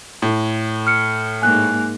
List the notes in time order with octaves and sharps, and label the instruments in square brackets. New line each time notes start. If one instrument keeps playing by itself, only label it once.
[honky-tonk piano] A2
[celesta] F6 C#7
[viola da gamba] G#2 A#3 [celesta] G#5 F#6